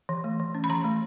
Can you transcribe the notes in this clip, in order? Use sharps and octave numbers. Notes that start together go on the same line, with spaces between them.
E3
A3
E3
C#4
B5
E3 A#5
A3